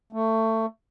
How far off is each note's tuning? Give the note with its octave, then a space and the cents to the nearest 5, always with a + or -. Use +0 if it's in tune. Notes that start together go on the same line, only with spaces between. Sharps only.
A3 +20